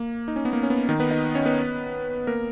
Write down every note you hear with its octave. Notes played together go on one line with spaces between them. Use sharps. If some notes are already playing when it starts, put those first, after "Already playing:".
Already playing: A#3
D#4
C#4
B3
A#3
C#4
B3
D#3 D#4
B3 B4
D#4 D#5
C#4 C#5
B3 B4
A#3 A#4